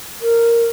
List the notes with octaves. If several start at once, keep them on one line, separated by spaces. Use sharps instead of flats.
A#4